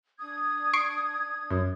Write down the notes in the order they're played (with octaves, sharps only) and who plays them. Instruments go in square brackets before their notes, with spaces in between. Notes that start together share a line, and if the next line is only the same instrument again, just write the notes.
[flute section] D4 D#6 G#6
[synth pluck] C#6 C7 D7
F#2